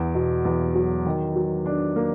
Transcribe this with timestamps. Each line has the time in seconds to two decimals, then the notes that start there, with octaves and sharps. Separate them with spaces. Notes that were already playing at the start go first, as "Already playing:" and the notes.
Already playing: E2
0.14 B2
0.45 E2
0.75 F#3
1.06 D#3
1.36 F#3
1.66 D4
1.96 A#3